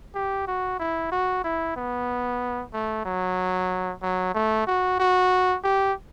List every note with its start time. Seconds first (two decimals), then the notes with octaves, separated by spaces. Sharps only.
0.15 G4
0.47 F#4
0.80 E4
1.12 F#4
1.44 E4
1.76 B3
2.73 A3
3.06 F#3
4.03 F#3
4.35 A3
4.67 F#4
5.00 F#4
5.64 G4